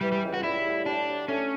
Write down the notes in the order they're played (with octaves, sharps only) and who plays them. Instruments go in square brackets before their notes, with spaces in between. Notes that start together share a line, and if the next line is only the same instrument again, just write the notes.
[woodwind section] E3 [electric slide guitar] G3
[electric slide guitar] G3
[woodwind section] C#2
[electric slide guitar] F#4
[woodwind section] G3 [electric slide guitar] E4
[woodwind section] A2
[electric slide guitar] D4 [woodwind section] G4
[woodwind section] F#3
[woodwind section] A3 [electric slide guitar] C#4